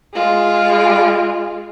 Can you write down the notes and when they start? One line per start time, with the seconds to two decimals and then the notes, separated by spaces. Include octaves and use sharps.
0.14 G#3 F4